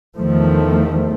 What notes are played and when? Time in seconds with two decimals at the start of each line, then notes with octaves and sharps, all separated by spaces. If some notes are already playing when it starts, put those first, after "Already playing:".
0.17 E2 D#3 F3 A3